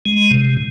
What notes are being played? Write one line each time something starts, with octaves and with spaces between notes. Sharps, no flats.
G#3
C3